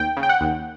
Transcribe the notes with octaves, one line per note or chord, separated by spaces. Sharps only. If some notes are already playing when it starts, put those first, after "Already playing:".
Already playing: D#2 G5
C#3
G5
F#5
D#2